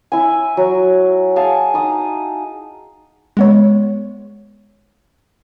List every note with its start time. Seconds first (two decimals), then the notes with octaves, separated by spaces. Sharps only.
0.12 E4 G#5
0.57 F#3
1.36 G#4 F5 G#5 A5
1.74 D#4 D#6
3.37 G#3 B3 C#5